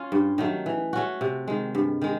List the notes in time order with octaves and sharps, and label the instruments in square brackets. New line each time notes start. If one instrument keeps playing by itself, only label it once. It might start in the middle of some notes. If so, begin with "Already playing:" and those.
Already playing: [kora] C#4 F4
G2
D#3 F#3 A3
E3
A3 C#4 F#4
C3
D#3 G#3
G2
D#3 G#3